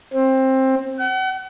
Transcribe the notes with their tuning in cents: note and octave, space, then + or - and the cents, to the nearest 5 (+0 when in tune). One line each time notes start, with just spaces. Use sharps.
C4 +15
F#5 +40